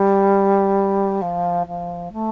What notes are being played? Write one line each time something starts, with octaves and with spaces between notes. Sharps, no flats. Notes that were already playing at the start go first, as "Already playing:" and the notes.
Already playing: G3
F3
F3
A3